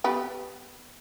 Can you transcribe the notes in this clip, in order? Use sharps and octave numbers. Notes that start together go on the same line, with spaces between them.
B3 G4 B4